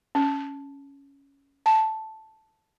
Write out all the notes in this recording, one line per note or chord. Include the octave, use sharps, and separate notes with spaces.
C#4
A5